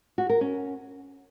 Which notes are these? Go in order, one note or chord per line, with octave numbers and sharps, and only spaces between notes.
F#4
A#4
C#4